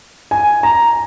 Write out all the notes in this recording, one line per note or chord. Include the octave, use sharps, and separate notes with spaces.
G#5
A#5